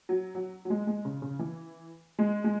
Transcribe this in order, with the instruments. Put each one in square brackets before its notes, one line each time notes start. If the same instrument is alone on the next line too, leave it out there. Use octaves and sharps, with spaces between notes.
[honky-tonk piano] F#3
F#3
F#3
G#3
G#3
C#3
C#3
E3
G#3
G#3